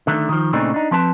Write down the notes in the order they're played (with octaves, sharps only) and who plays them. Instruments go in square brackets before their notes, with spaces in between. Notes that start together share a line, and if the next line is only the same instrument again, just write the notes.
[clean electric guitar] D3 D#3 A3
D#3 F3
A#2 C#3 A3 C4 D4 D#4
D4 D#4
F3 C4 B4 A5